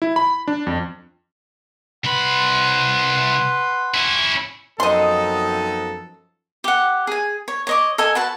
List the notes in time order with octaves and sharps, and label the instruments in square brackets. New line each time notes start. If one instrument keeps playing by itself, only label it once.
[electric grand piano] E4
B5
D4
F2
[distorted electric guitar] C2 B5 [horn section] B4 F#5 C6
[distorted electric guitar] C#4 E4
[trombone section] F#2 F3 [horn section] B3 C4 D#4 [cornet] A4 [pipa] D#5 C6
[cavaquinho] G4 F#5
G#4 G#5
C#5
C#5 D#5 D6
A4 D#5 G#5
F#4 B4 A5